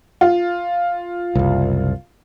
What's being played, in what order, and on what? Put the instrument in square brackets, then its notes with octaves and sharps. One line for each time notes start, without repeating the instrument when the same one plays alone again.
[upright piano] F4
[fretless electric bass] F#1 C2